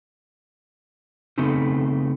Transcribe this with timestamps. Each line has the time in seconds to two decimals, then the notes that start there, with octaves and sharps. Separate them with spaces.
1.38 C#3 A3 B3 C4 D#4